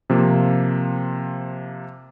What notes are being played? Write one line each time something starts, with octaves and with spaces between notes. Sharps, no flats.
C3 F3 A#3